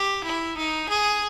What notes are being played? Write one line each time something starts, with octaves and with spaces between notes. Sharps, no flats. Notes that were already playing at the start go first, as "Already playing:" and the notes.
Already playing: G4
E4
D#4
G#4